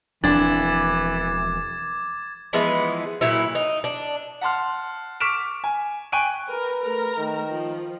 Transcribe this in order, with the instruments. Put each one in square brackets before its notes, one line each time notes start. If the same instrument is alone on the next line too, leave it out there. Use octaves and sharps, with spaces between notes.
[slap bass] E1 F3 C4 [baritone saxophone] E3 [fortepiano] D4 [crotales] D6 G#6 A6
[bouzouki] E3 F3 G#3 B3
A#2 F#3 E4
D#4
D4
[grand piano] F#5 A5 C6 F6
C#6 D6 F6 B6 D7 E7
G#5
G5 G#5 C#6 F#6 D7 D#7
[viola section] A#4 [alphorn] B4
[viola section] A3 A#4 A#5
[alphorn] D#3
[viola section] F3